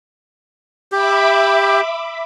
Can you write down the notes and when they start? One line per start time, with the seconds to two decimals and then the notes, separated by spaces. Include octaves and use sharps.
0.92 G4 E5 B5 D6